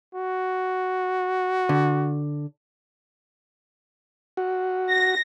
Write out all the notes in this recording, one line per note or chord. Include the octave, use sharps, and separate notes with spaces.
F#4
D3
F#4
A#6